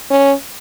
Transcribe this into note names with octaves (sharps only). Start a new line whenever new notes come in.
C#4